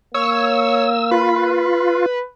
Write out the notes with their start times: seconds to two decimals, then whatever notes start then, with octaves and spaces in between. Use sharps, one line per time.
0.14 A#3 C#5 E6
1.11 F4 B4